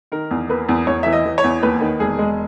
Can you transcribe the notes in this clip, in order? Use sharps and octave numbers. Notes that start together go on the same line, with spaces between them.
D#3 A#4
E2
A#3 B4
E2
E2 C#5
E3 E5
D#5
E3
C#5
E2
D#2 B4
D#3
E1 G#4
G#3